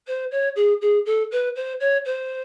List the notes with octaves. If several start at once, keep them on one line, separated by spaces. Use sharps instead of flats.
C5
C#5
G#4
G#4
A4
B4
C5
C#5
C5